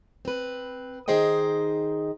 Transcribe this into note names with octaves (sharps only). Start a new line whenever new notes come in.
C4 B4
D#3 D#4 G#4 C5 D#5 G5